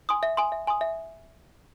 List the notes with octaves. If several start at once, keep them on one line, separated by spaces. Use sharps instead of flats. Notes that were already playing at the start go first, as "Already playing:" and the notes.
G#5 C6 D#6
E5
G#5 C6 D#6
E5
G#5 C6 D#6
E5